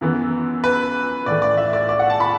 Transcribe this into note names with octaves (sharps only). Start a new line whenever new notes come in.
F#2 E3 B3
B4
A2 E3 A3 D5
D5
E5
D5
D5
F#5
A5
B5